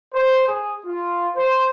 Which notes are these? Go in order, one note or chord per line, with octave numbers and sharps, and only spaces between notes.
C5
G#4
F4
C5